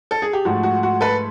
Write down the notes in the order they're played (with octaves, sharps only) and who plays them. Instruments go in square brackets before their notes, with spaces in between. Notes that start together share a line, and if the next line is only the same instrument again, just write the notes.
[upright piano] A4
G#4
G4
G#2 F3 A3 F#4
F#4
F#4
A4 B4